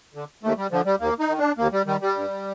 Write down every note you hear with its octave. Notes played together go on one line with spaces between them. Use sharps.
D3
D#2 A3
G3
D3 F3
G3
D#2 A#3
D#4
D#3
D4
D#2 A#3
G3
D#3 G3
G3
G2